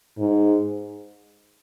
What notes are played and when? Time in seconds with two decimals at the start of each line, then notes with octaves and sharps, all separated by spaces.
0.18 G#2